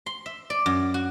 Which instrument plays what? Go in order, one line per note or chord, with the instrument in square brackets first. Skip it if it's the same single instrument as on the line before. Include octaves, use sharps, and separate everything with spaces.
[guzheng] C6
E5
D5
F#2
F#4